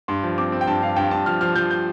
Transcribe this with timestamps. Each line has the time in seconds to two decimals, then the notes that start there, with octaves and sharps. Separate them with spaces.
0.08 G2 C6
0.23 F3
0.38 C4 D6
0.52 C4
0.61 G5
0.67 G2 A5
0.82 G2 F5
0.96 G2 G5
1.11 G2 A5
1.26 F3 F6
1.41 F3 F6
1.55 F3 G6
1.71 G6